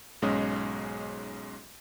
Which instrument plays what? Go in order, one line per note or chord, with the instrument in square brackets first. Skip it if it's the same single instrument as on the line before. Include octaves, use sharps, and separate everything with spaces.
[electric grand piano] B1 G#2 G#3 C#4 G#4 D#5